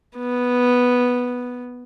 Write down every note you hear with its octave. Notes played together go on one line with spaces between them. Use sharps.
B3